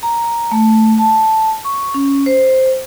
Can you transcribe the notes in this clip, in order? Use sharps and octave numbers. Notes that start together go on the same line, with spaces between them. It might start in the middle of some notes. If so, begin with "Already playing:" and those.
A#5
A3
A5
C#6
C#4
C5